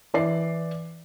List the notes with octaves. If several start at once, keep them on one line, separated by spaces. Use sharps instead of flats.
E3 D5 C7